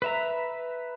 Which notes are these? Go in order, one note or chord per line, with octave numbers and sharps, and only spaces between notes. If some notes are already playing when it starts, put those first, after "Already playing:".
B4 E5 A#5